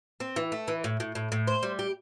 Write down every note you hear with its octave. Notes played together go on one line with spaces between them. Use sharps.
C4
E3
A3
E3
A2
A2
A2
A2
C5
G3
G4